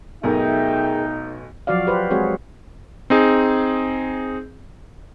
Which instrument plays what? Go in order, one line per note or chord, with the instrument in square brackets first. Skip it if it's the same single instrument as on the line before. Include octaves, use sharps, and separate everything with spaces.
[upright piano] B1 B2 A3 [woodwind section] D#4 [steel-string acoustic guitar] G#4 A#4 [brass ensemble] E5 G5
[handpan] F3 F#3 F#4 D5 F5
G4 B4 C5
G#3 C4 F#4 G#4 C#5
[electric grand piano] C4 D#4 G#4